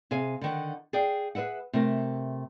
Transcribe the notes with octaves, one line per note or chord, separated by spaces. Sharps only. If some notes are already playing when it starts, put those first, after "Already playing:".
C3 G#4 F5 G#5
D3 D#3 F#5
G#4 D5 F5 G5
G#4 A#4 B4 E5 F#5
C3 A3 A#4